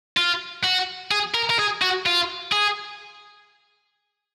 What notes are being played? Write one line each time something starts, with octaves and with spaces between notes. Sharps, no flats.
F4
F#4
G#4
A#4
A#4
G#4
F#4
F4
G#4